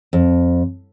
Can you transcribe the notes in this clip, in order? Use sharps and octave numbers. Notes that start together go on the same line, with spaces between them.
F2